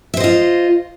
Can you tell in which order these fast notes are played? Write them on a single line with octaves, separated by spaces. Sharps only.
E5 C5 D#5 F4